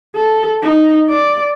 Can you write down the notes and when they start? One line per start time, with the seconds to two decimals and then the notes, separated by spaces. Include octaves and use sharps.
0.16 A4
0.63 D#4
1.10 D5